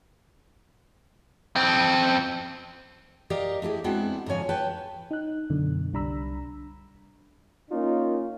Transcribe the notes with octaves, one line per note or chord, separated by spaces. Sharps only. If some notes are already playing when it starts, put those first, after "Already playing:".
F2 C4
G4 A#4 D5 D#5 F5
A3 E4 G4 G#4
G#3 B3 C4 D4 E4 F#4
G#2 D3 F3 C#5 G#5
B4 C#5 G5 A5
D#4 F#6
F#2 B2 D3
C2 G3 D4 A#5 B5 E6
A#3 C#4 D#4 F4